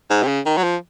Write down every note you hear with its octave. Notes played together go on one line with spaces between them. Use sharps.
G#2
C3
C#3
D#3
F#3
F3